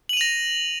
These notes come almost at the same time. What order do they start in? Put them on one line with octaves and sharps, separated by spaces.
F#7 D#7 F7 A#6